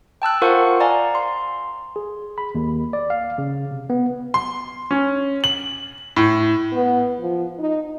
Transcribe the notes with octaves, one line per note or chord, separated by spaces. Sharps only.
G5 A5 E6 F#6
F4 A#4 C5 F5 F#5 C#6
D5 F5 G#5 A#5
C6
G#4
B5
D#2
D5
F5
C#3
C3
B3
C6
C#4
F#7
A2
B3
F3
D#4